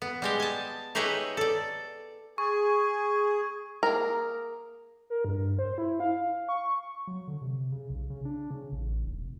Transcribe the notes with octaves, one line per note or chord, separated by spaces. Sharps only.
B3
G3 G#3 G4
G#5 A5
D#4 G4 G#4 B4 C#5 E5
A4 D5
G#4 C#6
A#3 G#4 A#4
A#4
G2
C5
E4
F5
C#6
F#3
D3
C3
C#3
B1
C#3
D4
C#3
A1
D#1
F1